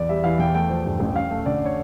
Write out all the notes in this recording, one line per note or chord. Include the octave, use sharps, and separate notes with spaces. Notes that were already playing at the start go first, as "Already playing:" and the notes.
Already playing: E2 D5
G3 E5
E3 F5
E2 G5
A3 G5
F3
G2
A1
C#4 F5
A3
D3 D5
C#5